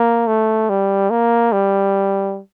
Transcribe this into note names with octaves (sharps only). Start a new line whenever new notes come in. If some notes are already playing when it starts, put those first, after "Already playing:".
Already playing: A#3
A3
G3
A#3
G3